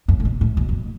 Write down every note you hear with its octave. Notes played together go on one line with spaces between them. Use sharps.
F#2
A2
B2
A2
B2
F#2